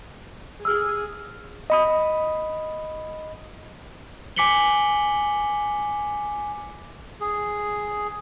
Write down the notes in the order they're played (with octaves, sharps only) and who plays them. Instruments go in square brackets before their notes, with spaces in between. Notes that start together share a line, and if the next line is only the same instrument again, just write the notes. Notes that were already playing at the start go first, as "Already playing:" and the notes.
[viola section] G#4 [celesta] E6 F6
[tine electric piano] D#5 B5 D#6
[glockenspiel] G#5 D6 B6 C#7 F#7 G7
[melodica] G#4